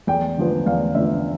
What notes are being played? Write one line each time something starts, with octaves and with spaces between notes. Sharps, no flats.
E2 G5
D3 F3 B3
E2 F5
D3 F3 B3 E5